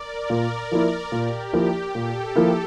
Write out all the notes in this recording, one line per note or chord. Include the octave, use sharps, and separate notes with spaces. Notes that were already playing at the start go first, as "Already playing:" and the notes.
Already playing: A#4 D5
A#2
F3 A#3 E4
A#2 G4
F3 A#3 E4
A#2 A4
F3 A#3 E4 G4